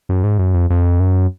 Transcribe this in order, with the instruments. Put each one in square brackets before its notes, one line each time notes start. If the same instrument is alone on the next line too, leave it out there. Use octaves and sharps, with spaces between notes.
[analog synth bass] F#2
G#2
F#2
F2
F2
F#2